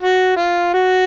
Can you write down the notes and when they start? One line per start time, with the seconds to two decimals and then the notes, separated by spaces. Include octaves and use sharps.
0.02 F#4
0.37 F4
0.74 F#4